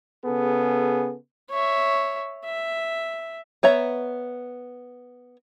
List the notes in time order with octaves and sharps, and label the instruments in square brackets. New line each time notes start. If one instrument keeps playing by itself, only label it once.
[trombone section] C#3 B3 G#4 A4
[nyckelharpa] C#5 E5
E5
[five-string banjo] B3 C#5 E5 A#5